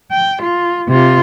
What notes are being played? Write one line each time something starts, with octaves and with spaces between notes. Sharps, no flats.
G5
F4
C3 F4